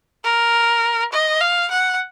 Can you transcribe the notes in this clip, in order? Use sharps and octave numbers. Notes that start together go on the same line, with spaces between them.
A#4
D#5
F5
F#5